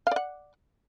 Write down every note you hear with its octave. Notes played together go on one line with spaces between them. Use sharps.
D5 F5 F#5